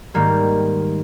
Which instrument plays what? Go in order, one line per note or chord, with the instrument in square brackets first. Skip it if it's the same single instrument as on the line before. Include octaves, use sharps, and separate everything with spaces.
[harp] G#2 D#3 G3 A#3